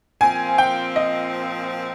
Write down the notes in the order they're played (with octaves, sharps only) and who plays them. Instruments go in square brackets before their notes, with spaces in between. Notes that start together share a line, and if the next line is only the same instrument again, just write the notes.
[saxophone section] A#2 F3 C4 [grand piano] G#5
[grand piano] G5
D#5